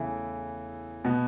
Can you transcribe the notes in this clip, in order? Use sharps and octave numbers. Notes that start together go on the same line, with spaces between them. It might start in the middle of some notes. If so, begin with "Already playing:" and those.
Already playing: E2 C#3 E3 A3 E4
B2 B3